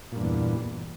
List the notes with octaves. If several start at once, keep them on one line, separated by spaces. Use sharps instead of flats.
E2 G2 A#2